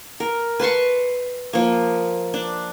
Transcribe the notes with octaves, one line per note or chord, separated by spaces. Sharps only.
A#4
B4 A5 C6 C#6
F3 A#3
D4